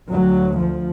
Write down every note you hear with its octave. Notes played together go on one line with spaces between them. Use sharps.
D2 F#3
F3